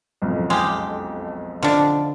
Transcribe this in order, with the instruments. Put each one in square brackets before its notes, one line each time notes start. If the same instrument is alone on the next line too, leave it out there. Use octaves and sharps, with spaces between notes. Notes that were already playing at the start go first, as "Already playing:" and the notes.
[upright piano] F#1 B1 F2
[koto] G#3 [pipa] F4 G4
[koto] D3 [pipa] F3 D4